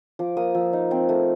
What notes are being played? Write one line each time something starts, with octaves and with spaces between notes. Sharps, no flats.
F3 D6
A#3 D#6
F3 E6
D#4
C4
A3